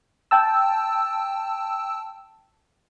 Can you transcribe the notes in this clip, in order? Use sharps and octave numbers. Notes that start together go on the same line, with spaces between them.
G5 A5 E6